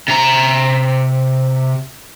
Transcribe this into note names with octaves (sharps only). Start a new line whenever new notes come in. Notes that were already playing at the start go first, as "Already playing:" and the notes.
C3 A#5